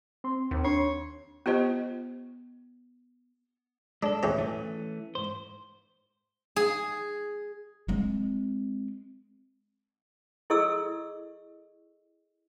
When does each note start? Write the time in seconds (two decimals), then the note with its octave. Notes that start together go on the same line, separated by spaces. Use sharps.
0.24 C4 C6
0.51 D#2
0.65 D4 C#5
1.46 B3 F4 G4 C5 D#5
4.03 G#3 D4 A4
4.23 A1 E2 C#5
4.38 E3 A3 C#4
5.15 G#2 C5
6.56 G#4
7.88 G#3 C4
10.50 E4 G#4 A4 D#5 C#6 E6